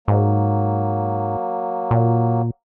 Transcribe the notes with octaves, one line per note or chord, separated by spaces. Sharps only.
G#2 F#3 A#3
A#2